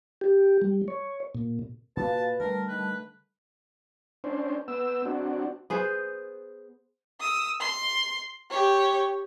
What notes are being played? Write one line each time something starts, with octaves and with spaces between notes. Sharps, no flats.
G4
G3
C#5
A#2
A#2 F#4 B4 F5 A5
D3 G3 A3 A#4 A5
D#3 B4
C#4 D4 C5
B3 E6
C4 D4 F#4
B3 G#4 C5
D#6 E6
C6
G4 C#5